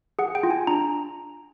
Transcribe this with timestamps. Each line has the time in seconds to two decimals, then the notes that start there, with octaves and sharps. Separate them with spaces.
0.19 G#4 F#5
0.35 G5
0.43 F4
0.51 G#5
0.67 D4 A#5